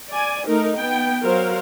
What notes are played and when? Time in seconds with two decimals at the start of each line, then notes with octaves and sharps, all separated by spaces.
0.11 D5 G#5
0.46 A3 D#4 A#4
0.77 B3 G5
1.24 F#3 A#4 C5 F5